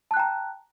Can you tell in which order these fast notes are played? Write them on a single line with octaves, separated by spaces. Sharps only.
A5 F#6 G5 A#5